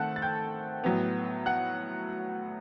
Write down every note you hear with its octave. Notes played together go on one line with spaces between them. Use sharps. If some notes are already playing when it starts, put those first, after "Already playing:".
Already playing: D#3 A3 C4 A4 F#5 A5 F#6
A6
G5 G6
A2 F#3 B3
F#5 F#6